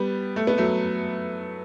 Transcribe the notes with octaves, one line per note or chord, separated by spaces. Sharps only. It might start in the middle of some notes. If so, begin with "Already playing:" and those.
Already playing: G3 B3
A3
B3
F#3 A3